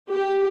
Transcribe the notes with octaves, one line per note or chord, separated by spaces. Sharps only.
G4